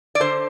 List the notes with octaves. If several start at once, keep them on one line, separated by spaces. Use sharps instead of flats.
D5
D3 C5